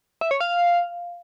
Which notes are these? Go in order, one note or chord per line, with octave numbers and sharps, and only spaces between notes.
E5
C#5
F5